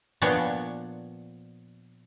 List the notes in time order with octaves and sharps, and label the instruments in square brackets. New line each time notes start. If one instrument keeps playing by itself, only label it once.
[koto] A#2 F3 B3 D4 C#5 G5